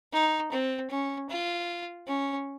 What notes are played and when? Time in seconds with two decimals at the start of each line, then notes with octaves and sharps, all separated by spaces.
0.12 D#4
0.51 C4
0.90 C#4
1.29 F4
2.07 C#4